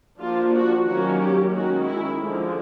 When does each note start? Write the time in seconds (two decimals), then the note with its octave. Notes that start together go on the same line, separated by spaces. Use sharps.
0.20 F3 A#3 D4 F4
0.54 F#4
0.87 D#3 F#3 A#3 C#4 F#4
1.20 G4
1.53 D#3 G#3 C#4 F#4
1.86 E4
2.20 D3 F3 G#3